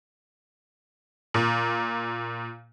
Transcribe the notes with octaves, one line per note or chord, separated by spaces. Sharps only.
A#2